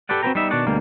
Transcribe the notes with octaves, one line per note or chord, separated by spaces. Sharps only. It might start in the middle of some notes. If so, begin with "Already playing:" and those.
G4 A4 B4 D5 F#5
C4 F#4 A4 B4 G5 A#5
G3 B3 D#4 E5
B2 D#3 D4 F#4 D5 F#5
D2 B2 G3 A#3